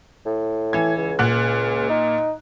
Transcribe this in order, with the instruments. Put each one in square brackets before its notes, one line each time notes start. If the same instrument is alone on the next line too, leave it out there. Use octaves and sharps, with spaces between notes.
[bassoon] A2
[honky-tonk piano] E3 G#6
[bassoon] C#2
[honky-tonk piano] A#2 F#6
[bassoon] D#4